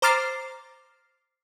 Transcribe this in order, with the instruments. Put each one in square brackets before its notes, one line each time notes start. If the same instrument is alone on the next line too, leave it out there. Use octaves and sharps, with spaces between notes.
[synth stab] C5 A#5 D6 F6 A6 C7